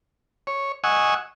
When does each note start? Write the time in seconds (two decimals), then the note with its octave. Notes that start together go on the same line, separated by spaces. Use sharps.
0.47 C#5
0.84 D#5 F#5 G#5 C#6 E6